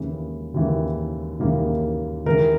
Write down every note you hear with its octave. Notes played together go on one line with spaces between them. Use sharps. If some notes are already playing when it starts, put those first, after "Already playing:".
Already playing: D#2 C#3 E3 A#3
D#2 C#3 E3 A#3
D#2 C#3 E3 A#3
D#2 C#3 E3 G#3 A#4